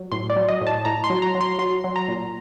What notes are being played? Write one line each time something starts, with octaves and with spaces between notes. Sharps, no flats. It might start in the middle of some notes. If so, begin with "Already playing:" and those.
Already playing: F#3
A2 C6
D5
F#3
D#5
A2
A5
A2 A#5
C6
F#3
A#5
F#3
C6
F#3 C6
F#3
A#5
A#2